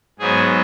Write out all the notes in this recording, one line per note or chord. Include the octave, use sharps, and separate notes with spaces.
G#2 F#3 B3 G#4